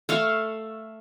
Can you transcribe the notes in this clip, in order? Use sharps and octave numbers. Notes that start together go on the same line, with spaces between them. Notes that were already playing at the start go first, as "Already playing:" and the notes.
A3 F5 C#6